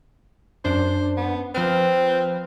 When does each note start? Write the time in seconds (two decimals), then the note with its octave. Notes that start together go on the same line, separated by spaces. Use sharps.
0.65 F#2 D4 C5
1.17 B3
1.55 F3 C4 B4 F6